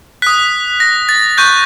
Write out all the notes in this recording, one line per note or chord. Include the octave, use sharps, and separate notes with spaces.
D#6 F#6 B6
A#6
A6
C#6 F#6 G6